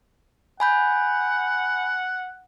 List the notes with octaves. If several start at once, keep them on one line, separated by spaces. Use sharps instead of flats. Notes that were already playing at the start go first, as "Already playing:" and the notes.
F#5 G#5 B5 G6